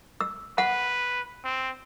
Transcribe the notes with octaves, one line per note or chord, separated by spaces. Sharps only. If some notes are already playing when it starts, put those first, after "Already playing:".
E6
B4 F#5
C4